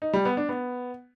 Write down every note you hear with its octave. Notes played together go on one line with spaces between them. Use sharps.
D#4
G3
B3
D4
B3